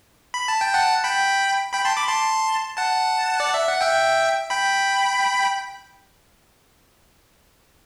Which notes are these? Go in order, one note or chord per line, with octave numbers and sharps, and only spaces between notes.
B5
A5
G5
F#5 A5
G5 B5
G5 B5
A5 C6
B5 D6
A5 C6
F#5 A5
D5
E5
F#5
E5 G5
G5 B5